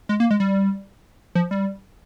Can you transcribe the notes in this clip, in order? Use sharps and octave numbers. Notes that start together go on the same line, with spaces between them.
G#3
A#3
G#3
G3
F3
G3